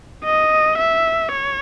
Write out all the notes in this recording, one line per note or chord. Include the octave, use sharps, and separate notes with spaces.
D#5
E5
C#5